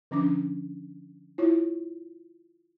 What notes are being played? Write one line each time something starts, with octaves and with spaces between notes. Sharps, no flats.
D3 F3 C#4 D4 D6
E4 F4 C#5